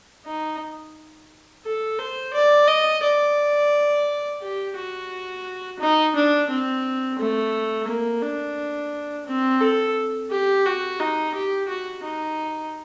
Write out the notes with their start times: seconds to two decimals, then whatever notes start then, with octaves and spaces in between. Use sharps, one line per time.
0.26 D#4
1.65 A4
1.99 C5
2.33 D5
2.68 D#5
3.03 D5
4.41 G4
4.76 F#4
5.80 D#4
6.15 D4
6.50 C4
7.19 A3
7.88 A#3
8.22 D4
9.27 C4
9.61 A4
10.31 G4
10.66 F#4
11.00 D#4
11.35 G4
11.68 F#4
12.03 D#4